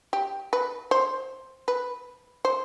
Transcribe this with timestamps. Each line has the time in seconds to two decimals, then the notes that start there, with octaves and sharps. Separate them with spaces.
0.13 G4
0.53 B4
0.91 C5
1.68 B4
2.45 C5